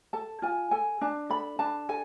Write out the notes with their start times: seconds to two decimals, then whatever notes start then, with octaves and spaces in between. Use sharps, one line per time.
0.13 A4 A5
0.42 F4 G#5
0.71 A4 G#5
1.01 D4 A5
1.30 A4 B5
1.59 D4 A5
1.89 A4 G#5